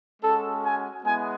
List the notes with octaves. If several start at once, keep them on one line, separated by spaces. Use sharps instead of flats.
G#3 C#4 F#4 A4
G#5
G#3 B3 E4 G#5